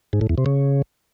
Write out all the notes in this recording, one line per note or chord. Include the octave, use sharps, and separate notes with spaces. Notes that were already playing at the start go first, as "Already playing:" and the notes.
G#2
A2
E2
C3
C#3